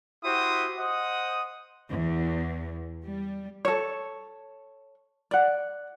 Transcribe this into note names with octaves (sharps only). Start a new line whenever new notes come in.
E4 F#4 G4 C5 D#6
C5 D#5 F#5 D#6
E2
G3
A4 C#5
D5 F#5